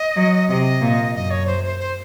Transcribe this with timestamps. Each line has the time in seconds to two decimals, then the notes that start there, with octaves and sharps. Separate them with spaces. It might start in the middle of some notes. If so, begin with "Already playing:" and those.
Already playing: D#5
0.16 F#3
0.49 C3 D#5
0.81 A#2
1.14 F#2 D#5
1.30 C#5
1.47 C5
1.64 C5
1.79 C5